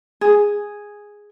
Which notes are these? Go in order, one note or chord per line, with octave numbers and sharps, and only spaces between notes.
G#4